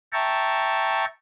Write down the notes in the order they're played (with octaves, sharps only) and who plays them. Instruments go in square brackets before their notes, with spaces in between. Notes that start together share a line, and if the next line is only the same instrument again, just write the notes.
[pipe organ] E5 G5 A5 A#5 C#6